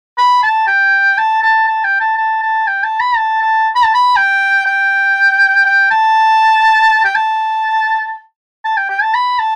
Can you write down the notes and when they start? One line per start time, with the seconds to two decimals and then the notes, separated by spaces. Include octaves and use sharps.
0.18 B5
0.43 A5
0.68 G5
1.18 A5
1.43 A5
1.68 A5
1.84 G5
2.00 A5
2.17 A5
2.43 A5
2.68 G5
2.84 A5
3.01 B5
3.17 A5
3.42 A5
3.76 B5
3.85 A5
3.95 B5
4.16 G5
4.66 G5
5.66 G5
5.91 A5
7.05 G5
7.15 A5
8.65 A5
8.77 G5
8.90 G5
9.02 A5
9.15 B5
9.39 A5